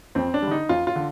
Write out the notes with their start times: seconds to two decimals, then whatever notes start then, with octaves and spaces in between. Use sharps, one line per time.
0.15 F2 C4
0.34 D4
0.42 G3
0.47 D3 D#4
0.69 F2 F4
0.87 F4
0.96 D3